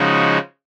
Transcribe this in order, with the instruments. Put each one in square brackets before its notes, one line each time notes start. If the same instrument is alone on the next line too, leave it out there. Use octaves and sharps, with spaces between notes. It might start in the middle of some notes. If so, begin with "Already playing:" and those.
Already playing: [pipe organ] C#3 F3 G#3 D#4 F#4